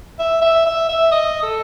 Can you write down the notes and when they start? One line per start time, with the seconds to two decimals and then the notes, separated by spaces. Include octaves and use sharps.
0.19 E5
0.42 E5
0.66 E5
0.89 E5
1.11 D#5
1.43 A4